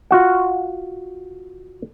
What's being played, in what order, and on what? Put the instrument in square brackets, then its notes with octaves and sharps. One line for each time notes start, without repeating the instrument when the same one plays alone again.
[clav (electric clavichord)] F4 F#4 F#5